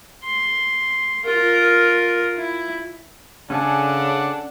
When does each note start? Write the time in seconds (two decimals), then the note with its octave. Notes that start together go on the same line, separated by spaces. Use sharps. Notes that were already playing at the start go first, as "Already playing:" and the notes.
0.23 C6
1.25 F4 A#4
2.37 E4
3.50 C#3 C#4 D4 A4 F#5 G#5